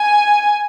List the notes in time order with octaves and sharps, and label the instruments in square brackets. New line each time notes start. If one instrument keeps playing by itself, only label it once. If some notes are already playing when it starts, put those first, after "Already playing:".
Already playing: [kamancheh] G#5